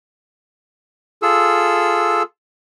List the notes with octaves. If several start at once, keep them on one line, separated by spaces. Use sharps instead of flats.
F4 G#4 A4 E6